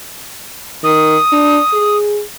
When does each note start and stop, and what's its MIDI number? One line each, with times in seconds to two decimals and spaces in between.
0.84 1.16 51
0.84 1.97 87
1.32 1.59 62
1.73 2.22 68